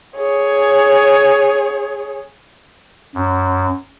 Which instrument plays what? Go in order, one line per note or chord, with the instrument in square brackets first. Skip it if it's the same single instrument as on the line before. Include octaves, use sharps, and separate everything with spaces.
[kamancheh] G#4 C#5
[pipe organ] F#2